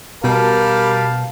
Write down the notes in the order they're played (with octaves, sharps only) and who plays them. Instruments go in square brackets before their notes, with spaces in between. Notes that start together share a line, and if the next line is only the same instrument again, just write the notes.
[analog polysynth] B2 [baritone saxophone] G3 [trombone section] A#4 [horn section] F5 A5